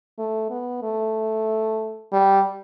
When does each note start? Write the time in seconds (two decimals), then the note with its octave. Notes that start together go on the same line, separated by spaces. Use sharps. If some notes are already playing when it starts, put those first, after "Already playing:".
0.19 A3
0.50 B3
0.83 A3
2.12 G3